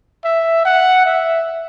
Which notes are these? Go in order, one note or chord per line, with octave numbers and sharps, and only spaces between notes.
E5
F#5
E5